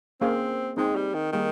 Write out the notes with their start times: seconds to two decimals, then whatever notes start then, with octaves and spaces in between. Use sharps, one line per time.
0.21 A#3 C4 C#4 G#4 C5 F5
0.77 G#3 C4 D#4 G#4 C5 G5
0.96 G3
1.14 D#3
1.32 D#3 G3 A#3 D#4 G#4